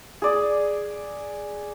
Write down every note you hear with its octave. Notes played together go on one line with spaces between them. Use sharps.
G#4 D5